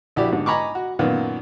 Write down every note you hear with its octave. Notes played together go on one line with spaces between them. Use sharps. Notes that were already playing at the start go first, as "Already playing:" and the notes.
A#1 E4 F#4 G4 D5
G#2 D3
D#5 G#5 A#5 B5 C#6 D6
F#4
F#2 A#2 D#3 A#3 B3